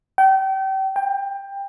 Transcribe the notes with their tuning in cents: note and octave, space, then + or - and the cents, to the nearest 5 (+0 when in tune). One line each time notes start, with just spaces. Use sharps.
G5 -35
G5 +20